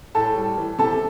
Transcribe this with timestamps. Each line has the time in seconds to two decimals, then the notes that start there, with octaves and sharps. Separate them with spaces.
0.15 A2 A4 A5
0.36 G3
0.57 E3
0.79 C3 A4 A5